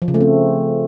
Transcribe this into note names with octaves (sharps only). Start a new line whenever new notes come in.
F3
C#3
A3
C4